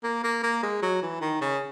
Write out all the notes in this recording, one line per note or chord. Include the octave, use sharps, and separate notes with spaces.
A#3
A#3
A#3
G#3
F#3
E3
D#3
C#3